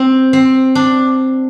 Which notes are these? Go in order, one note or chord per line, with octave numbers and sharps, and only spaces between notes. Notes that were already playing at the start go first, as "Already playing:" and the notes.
Already playing: C4
C4
D4